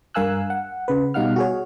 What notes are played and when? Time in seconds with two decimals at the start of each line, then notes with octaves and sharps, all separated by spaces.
0.14 G2 A#4 F5 G#5 E6 F#6
0.50 F#5
0.88 C#3 B4
1.14 B2 G3 D#4 F5 F#5 F6
1.36 F#4 G#4 C#5